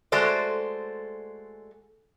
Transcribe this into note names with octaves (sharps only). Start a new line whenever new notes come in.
G#3 A3 F#4 A4 C5 D5